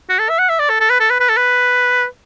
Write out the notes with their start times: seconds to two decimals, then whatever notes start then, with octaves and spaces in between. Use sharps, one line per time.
0.09 F#4
0.19 A4
0.29 E5
0.39 F#5
0.49 E5
0.59 D5
0.69 A4
0.80 A4
0.90 B4
1.00 A4
1.10 B4
1.20 B4
1.29 A4
1.37 B4